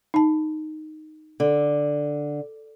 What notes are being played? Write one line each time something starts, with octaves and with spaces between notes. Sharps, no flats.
D#4 A5
D3